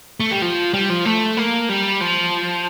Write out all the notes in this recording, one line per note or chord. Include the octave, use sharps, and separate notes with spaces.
A3
G3
F3
G3
F3
A3
A#3
G3
F3